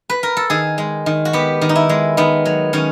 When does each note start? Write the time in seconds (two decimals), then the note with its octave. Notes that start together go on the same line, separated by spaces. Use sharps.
0.10 B4
0.23 A#4
0.37 A4
0.50 D#3 G#4
0.78 G#3
1.06 D#3
1.25 F#4
1.33 B3 G4
1.62 D#3
1.69 D#4
1.76 E4
1.89 G#3
2.17 D#3 B3
2.45 F#3
2.73 D#3 C#4